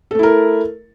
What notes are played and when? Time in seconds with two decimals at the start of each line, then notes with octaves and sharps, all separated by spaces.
0.11 A4
0.15 A3
0.19 E4
0.23 A#4